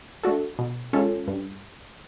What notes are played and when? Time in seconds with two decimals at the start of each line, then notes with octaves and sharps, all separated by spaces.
0.23 A3 D4 F#4 A4
0.59 B2
0.93 G#3 C#4 F4 A4
1.28 G2